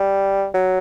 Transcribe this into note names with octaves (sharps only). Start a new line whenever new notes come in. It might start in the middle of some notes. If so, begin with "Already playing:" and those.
Already playing: G3
F#3